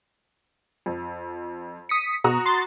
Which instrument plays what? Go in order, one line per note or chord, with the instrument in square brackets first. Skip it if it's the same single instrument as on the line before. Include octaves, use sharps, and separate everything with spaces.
[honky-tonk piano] F2
[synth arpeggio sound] D#6 B6 C#7
[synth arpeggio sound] B2 [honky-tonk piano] F#4 A#5 D#6
[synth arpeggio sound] C6 A6